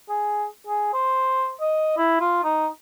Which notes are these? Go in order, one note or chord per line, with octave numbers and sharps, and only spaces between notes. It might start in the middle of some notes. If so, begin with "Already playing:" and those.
G#4
G#4
C5
D#5
E4
F4
D#4